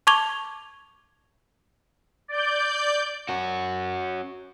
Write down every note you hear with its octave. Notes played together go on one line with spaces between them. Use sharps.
A5 C#6 D6 G#6 F7 G7
D5 G6
C#4 F#4